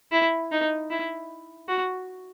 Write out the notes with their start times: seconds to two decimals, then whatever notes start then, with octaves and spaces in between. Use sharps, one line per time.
0.12 E4
0.51 D#4
0.90 E4
1.68 F#4